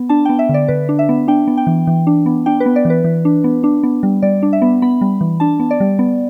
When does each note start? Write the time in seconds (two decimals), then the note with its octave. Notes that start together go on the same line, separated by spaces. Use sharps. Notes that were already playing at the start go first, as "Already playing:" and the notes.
Already playing: B3
0.09 D4 A5
0.25 B3 G5
0.39 E5
0.49 D3
0.54 D5
0.68 D3 B4
0.89 D4
0.99 E5
1.09 B3
1.28 D4 G5
1.48 B3
1.57 G5
1.67 E3
1.87 E3
2.07 D4
2.26 B3
2.46 D4 G5
2.60 B4
2.66 B3
2.76 D5
2.85 E3
2.90 B4
3.04 E3
3.25 D4
3.44 B3
3.64 D4
3.83 B3
4.03 G3
4.22 G3 D5
4.43 D4
4.53 E5
4.62 B3
4.82 B3 B5
5.01 G3
5.21 E3
5.40 D4 A5
5.60 B3
5.71 D5
5.80 G3
5.99 B3